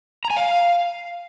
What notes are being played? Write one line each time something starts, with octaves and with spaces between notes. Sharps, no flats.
A#5
G#5
F5